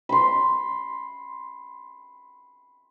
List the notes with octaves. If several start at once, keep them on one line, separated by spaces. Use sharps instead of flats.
B5 C6